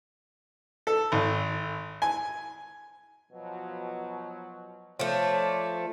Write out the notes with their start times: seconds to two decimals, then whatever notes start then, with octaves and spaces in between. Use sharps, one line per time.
0.87 A4
1.12 G#1
2.02 G#5
3.32 B2 F3 F#3
4.99 F3 A3 C#5 D5